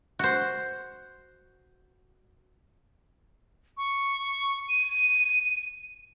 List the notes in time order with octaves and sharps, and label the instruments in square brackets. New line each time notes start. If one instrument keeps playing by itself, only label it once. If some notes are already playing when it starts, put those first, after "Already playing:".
[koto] F#4 C5
[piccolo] C#6
D#7